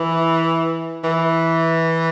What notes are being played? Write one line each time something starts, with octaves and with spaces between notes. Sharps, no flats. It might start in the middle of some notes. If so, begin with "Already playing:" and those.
Already playing: E3
E3